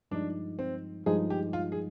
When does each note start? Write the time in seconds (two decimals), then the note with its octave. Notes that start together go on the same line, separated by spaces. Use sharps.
0.11 G2 F3 G#3 D4 D#4
0.59 C4
1.06 G2 F3 G#3 D#4 G#4
1.30 G4
1.53 F4
1.72 G#4